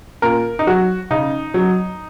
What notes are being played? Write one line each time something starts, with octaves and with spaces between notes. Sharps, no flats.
A#2 A#4
D#4
F#3 F#4
C#3 D#4
F#3